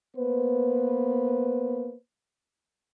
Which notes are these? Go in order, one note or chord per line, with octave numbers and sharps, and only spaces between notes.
A#3 B3 B4 C5